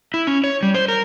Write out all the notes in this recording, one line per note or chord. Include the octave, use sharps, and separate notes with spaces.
E4
C#4
C#5
G3
C5
A#4